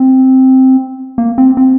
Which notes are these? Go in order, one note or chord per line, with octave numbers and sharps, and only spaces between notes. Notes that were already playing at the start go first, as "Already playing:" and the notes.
Already playing: C4
A#3
C4
C4